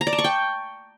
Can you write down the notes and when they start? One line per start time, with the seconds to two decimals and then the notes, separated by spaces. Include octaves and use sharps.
0.01 A#5
0.07 D5
0.13 A5
0.18 C#6
0.24 G5